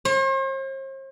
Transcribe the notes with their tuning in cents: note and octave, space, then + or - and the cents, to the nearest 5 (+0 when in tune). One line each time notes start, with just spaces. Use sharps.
C5 +45